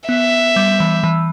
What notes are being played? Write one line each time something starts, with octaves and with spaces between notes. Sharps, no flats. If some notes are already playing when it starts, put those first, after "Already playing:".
B3 E5
G3
E3
E3